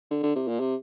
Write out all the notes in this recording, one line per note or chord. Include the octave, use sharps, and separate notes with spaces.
D3
D3
C3
A#2
C3